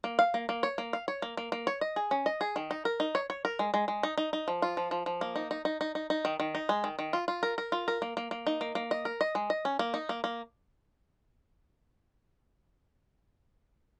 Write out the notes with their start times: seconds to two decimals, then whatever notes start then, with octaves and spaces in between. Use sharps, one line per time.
0.04 A#3
0.19 F5
0.34 A#3
0.49 A#3
0.63 C#5
0.78 A#3
0.93 F5
1.08 C#5
1.22 A#3
1.37 A#3
1.52 A#3
1.67 C#5
1.81 D#5
1.96 G#4
2.11 C#4
2.26 D#5
2.41 G#4
2.56 D#3
2.71 D#4
2.85 A#4
3.00 D#4
3.15 C#5
3.30 C#5
3.45 A#4
3.59 G#3
3.74 G#3
3.88 G#3
4.03 D#4
4.18 D#4
4.33 D#4
4.48 F3
4.62 F4
4.77 F3
4.91 F3
5.06 F3
5.21 A#3
5.36 D#4
5.51 D#4
5.65 D#4
5.81 D#4
5.95 D#4
6.10 D#4
6.25 D#3
6.40 D#3
6.55 D#4
6.69 G#3
6.84 D#3
6.99 D#3
7.13 F4
7.28 F4
7.43 A#4
7.58 A#4
7.72 F4
7.88 A#4
8.02 A#3
8.17 A#3
8.31 A#3
8.47 D#4
8.61 A#3
8.75 A#3
8.91 D#5
9.05 A#4
9.21 D#5
9.35 G#3
9.50 D#5
9.65 C#4
9.79 A#3
9.94 D#4
10.09 A#3
10.24 A#3